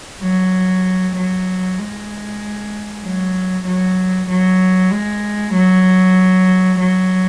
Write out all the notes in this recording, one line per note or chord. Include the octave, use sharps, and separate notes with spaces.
F#3
F#3
G#3
F#3
F#3
F#3
G#3
F#3
F#3